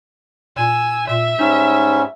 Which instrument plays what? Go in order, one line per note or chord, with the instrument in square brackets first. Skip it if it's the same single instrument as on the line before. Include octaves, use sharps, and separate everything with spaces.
[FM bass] A#2 [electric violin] G#5 E6
[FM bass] A#2 [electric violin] E5
[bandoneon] G#2 G3 C#4 [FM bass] D#4